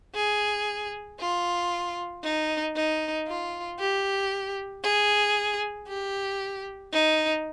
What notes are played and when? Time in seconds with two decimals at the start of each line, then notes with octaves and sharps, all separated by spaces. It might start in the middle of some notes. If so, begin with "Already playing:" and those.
0.15 G#4
1.20 F4
2.23 D#4
2.75 D#4
3.27 F4
3.79 G4
4.83 G#4
5.88 G4
6.92 D#4